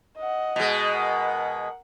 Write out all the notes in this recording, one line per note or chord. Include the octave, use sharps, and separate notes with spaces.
D#5 F#5
B2 G#3
A#4 F#5